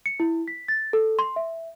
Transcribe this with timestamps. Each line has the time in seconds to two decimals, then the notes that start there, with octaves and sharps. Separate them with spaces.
0.06 C#7
0.20 E4
0.48 B6
0.68 A6
0.93 A4
1.19 C6
1.36 E5